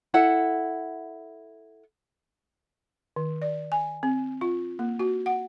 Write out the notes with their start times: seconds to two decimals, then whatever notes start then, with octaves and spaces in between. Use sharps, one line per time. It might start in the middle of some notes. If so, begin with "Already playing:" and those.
0.14 E4 A4 F#5
3.16 D#3
3.42 D5
3.72 G#5
4.03 C4
4.41 F4
4.79 A#3
4.99 F#4
5.26 F#5